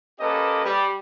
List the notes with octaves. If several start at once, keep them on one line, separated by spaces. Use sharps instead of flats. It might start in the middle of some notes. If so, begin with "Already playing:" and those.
A#3 C#4 G4 A4 B4 D#5
G3